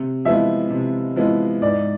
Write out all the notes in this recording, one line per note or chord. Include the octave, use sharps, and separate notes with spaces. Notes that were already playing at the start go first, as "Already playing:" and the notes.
Already playing: C3
F3 G#3 B3 E4 E5
C3
F3 G#3 B3 E4
G#2 D5